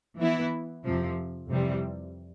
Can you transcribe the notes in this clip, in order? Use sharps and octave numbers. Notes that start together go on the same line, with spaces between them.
E3 B3 E4
F2 C3 F3
F2 C3 E3 G3